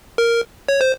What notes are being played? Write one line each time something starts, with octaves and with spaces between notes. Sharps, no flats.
A#4
C#5
C5